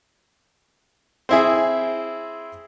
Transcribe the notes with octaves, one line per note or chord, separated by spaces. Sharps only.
C4 E4 G#4